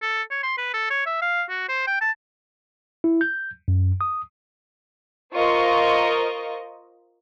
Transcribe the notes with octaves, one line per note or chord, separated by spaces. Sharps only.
A4
C#5
C6
B4
A4
C#5
E5
F5
F#4
C5
G5
A5
E4
G6
F#2
D#6
F4 A#4 C5 D#5 C#6